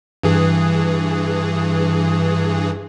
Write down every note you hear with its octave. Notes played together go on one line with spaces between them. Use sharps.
G2 E3 G#4